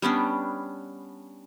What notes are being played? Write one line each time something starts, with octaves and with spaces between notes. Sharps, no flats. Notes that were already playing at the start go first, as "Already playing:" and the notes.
G3 B3 C#4 D4